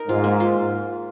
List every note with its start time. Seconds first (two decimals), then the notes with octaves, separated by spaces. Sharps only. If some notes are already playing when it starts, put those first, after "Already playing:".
Already playing: D#4 A#4
0.08 G#2 F4
0.24 A#3
0.40 F4